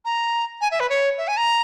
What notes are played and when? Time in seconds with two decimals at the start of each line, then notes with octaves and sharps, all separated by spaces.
0.05 A#5
0.61 G#5
0.71 E5
0.80 B4
0.90 C#5
1.18 E5
1.28 G#5
1.37 A#5